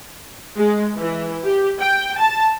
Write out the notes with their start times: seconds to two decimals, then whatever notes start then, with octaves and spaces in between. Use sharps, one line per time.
0.58 G#3
0.96 E3
1.44 G4
1.80 G5
2.19 A5